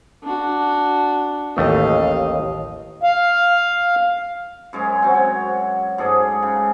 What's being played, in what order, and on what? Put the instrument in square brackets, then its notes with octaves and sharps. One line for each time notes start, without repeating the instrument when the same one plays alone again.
[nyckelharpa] D4 F#4
[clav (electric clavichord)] A1 D#2 A3 [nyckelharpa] D#5 F5
[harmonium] F5
[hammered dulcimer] F#2 G#3 C#5 G#5
C4 F#4
C#5
G#2 G#4 A4 D5
C#3